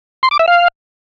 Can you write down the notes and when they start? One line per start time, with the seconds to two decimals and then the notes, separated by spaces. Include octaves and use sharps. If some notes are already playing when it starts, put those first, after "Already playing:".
0.23 C6
0.31 D6
0.39 E5
0.48 F5